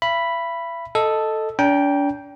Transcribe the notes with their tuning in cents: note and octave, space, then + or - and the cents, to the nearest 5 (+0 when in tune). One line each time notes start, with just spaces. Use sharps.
E5 +40 B5 +0
A4 +0 D#5 +0
D4 -40 G5 +0 A#5 +30